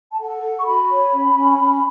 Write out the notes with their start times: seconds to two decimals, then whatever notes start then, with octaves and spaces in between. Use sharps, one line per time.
0.09 A5
0.19 A4 F#5
0.43 A4
0.59 C#6
0.66 F#4 B5
0.89 C#5
1.13 C#4
1.35 C#4
1.59 C#4